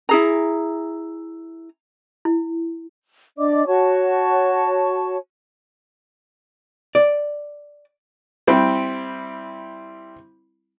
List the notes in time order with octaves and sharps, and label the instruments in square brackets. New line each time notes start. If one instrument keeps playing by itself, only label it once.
[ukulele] E4 G#4 A#5
[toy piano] E4
[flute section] D4 D5 D#5 D6
F#4 C#5 A5 C#6
[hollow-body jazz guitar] D5
[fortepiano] G3 C4 E4 G5